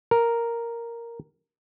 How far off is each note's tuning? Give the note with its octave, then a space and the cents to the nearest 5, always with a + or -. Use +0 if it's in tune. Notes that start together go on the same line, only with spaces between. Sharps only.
A#4 +0